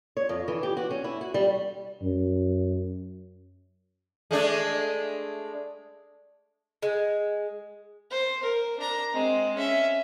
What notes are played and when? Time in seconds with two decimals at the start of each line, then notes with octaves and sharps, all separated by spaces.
0.17 C#5
0.29 F2
0.48 E3
0.63 G4
0.77 F#4
0.91 C#4
1.04 E4
1.21 F#4
1.34 G3
2.02 F#2
4.31 G#3 A3 D4
6.83 G#3
8.11 C5
8.43 A#4
8.79 D4 A#5
9.13 G#3 C4
9.55 C#4 E5